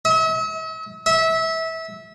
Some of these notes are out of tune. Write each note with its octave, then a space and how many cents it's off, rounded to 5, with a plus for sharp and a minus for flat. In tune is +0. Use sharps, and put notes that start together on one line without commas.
E5 -45
E5 -25